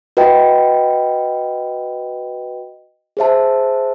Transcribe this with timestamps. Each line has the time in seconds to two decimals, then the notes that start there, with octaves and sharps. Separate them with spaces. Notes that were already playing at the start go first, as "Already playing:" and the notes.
0.17 F#4 B4 D#5 G5
3.17 G#4 C5 E5 A5